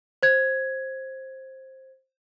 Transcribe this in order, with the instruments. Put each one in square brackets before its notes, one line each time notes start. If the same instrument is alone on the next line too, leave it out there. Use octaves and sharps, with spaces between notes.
[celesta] C5 G#6